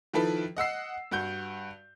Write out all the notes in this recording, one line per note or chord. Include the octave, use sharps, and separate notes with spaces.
D#3 F3 E4 A4 B4
D#5 F#5 E6 C7
G2 F#4 G6